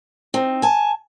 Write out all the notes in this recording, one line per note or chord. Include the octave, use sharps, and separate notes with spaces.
C4 D#4
G#5 A5